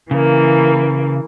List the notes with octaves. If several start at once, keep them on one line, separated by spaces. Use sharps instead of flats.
C#3 E3 A#3